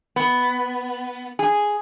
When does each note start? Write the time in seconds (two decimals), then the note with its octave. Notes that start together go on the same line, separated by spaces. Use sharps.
0.16 B3
1.39 G#4